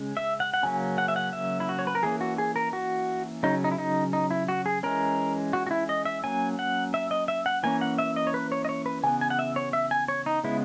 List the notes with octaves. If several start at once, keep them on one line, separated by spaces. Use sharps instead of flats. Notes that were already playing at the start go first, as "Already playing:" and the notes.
Already playing: C#3 G#3 C#4
E5
F#5
F#5
C#3 F#3 A#3 C#4 G#5
F#5
E5
F#5
E5
E4
F#4
C#5
B4
A#4
E3 A#3 C#4 G#4
F#4
G#4
A#4
F#4
C#3 F#3 C#4 D#4
D#4
E4
D#4
D#4
E4
F#4
G#4
E3 G#3 C#4 A#4
F#4
F#4
E4
D#5
E5
F#3 A#3 C#4 G#5
F#5
E5
D#5
E5
F#5
E3 A#3 C#4 G#5
F#5
E5
D#5
C#5
B4
C#5
D#5
C#5
B4
C#3 E3 B3 G#5
G#5
F#5
E5
C#5
E5
G#5
C#5
D#4
C#3 G#3 B3 E4